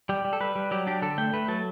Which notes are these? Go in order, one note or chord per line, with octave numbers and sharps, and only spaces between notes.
G3 G4
G3
A4
G3 B4
G3
F#3 G4
D4 G4
D3 A4
A3 G5
A3 B4
F#3 A4